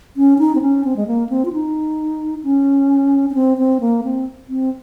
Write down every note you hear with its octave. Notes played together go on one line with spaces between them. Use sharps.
C#4
D#4
C4
C#4
C4
G#3
A#3
C4
F4
D#4
C#4
C#4
C4
C4
A#3
C4
C4